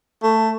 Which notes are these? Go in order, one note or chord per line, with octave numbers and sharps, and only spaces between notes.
A3